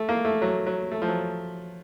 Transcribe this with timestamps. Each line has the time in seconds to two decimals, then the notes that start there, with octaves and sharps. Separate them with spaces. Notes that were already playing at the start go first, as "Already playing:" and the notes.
Already playing: A3
0.09 A#3
0.25 A3
0.42 F#3
0.67 F#3
0.92 A3
1.02 F3
1.08 F#3